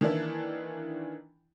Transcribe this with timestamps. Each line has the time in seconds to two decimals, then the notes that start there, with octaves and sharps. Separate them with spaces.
0.01 D#3 E3 A#3 D4 E4